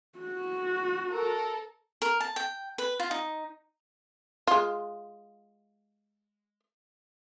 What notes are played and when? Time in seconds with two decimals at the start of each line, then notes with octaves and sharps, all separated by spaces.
0.19 F#4
1.10 A4 A#4
2.02 A#4
2.20 A5
2.36 G5
2.78 B4
3.00 F4
3.11 D#4
4.47 G#3 F4